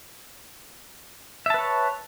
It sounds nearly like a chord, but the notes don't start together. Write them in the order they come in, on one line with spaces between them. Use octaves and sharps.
E5 A5 B4 C#5